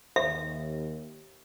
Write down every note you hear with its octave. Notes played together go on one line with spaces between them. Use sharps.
D#2 E5